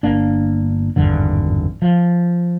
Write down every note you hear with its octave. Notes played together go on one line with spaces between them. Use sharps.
G1 A#3 D4
G#1 E2 G2 D3
F3